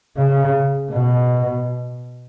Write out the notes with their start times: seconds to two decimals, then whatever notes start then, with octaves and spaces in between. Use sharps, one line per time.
0.17 C#3
0.92 B2